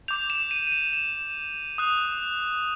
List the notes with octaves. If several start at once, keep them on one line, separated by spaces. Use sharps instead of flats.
D6 G6 F7
E7
D#7
D#7
E7
E7
D#6 F#6